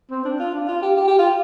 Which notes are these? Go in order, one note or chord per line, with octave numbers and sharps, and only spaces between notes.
C4
D4
F4
D4
F4
G4
G4
G4
F4